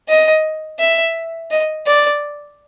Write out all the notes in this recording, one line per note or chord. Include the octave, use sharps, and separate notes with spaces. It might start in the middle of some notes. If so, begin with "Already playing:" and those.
D#5
E5
D#5
D5